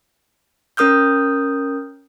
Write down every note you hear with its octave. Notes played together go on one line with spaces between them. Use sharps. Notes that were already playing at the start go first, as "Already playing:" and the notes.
C#4 A#4 D#6 F6 G6